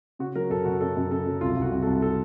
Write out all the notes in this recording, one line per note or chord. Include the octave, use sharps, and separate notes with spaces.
C#3 F#4
F#3 A#4
F#2 A4
F#2 F#4
F#2 A4
F#2
C#3 A4
F#3
C2 F4
C2
F#4
C2
A4
C2
A4